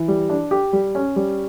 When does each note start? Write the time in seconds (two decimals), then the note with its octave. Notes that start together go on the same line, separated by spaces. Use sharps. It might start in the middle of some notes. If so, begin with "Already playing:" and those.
Already playing: E3
0.08 G3
0.29 D4
0.51 G4
0.73 G3
0.95 C#4
1.16 G3